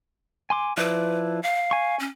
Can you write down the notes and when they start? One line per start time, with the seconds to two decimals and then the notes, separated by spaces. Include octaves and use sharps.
0.50 G#5 C6 D6
0.77 F3 E4 B4 D5
1.43 F5
1.71 G#5 C#6
1.99 C#4